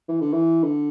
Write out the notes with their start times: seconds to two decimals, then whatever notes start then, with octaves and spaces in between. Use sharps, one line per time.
0.09 E3
0.21 D3
0.33 E3
0.64 D3